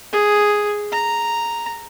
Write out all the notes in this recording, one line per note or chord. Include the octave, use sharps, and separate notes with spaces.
G#4
A#5